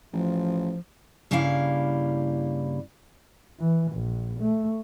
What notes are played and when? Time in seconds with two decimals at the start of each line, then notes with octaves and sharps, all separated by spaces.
0.13 A1 F3
1.31 G2 C#3 G3 A#3 E4 F5
3.59 E3
3.93 A#1
4.41 A3